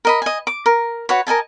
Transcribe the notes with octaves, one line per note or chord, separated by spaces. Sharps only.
A#4 D#5 B5
D#5 G#5
D6
A#4
F#4 B4 C#5
A#4 D#5 G#5 A5